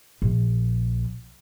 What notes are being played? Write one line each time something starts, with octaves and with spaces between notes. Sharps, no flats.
A#1